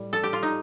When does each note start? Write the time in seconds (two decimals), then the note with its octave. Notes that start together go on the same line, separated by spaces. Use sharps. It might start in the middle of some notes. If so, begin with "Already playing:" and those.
Already playing: A2 G3
0.13 A4
0.23 G4
0.33 F4
0.43 D#4